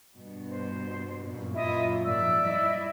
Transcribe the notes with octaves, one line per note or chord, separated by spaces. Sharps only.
G2 B2
C5
F#2 A#2
F#3 E4 F4 D#5 E5
G#2 D#3 F3 D5 E5 E6
G3 E4 D#5